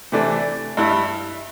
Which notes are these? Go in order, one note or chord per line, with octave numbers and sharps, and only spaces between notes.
C3 E3 A3 D4
G2 G3 E4